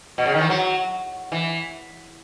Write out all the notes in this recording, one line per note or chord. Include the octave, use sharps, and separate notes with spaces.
B2
C#3
D#3
E3
F#3
E3